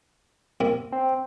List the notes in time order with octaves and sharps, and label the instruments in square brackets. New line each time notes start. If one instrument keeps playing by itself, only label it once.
[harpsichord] C3 A#3 E4
[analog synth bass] C4